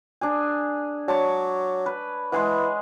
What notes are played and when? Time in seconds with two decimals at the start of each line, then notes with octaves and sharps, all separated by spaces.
0.21 D4 G#4 G#5
1.08 F#3 C#5 D5 A5
1.86 B4
2.32 E3 G#3 G#4 F#5